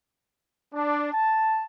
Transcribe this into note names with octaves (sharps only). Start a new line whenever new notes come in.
D4
A5